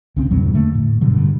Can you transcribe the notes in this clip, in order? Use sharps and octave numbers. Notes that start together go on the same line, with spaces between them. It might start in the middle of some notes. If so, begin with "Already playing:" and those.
C2 C#3 C4
E2 G2 A#2 F#3
D3 A3 A#3
A2
G2 B2 D3 F#3